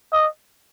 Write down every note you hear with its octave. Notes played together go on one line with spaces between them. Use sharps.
D#5